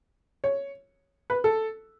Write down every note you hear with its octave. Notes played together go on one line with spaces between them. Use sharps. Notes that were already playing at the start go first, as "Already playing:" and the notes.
C#5
B4
A4